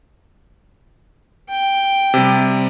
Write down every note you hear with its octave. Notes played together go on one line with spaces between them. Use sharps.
G5
C3 G3